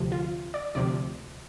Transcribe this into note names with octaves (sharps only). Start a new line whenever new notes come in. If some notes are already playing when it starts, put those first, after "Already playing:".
Already playing: D2 C3 F3
F4
D5
D2 C3 F3 D5